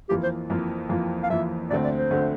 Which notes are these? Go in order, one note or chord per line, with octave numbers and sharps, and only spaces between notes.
F2 E3 A#3 F4 G4
C5
F2 E3 A#3 F4
F2 E3 A#3 F4
F5
F2 E3 A#3 F4 E5
D2 D3 A3 C4 D5
D5
C5
D2 D3 A3 C4